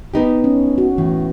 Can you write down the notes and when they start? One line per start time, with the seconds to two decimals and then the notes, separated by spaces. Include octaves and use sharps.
0.14 B3 D#4 G4
0.44 C#4
0.78 F#4
0.98 A2 E3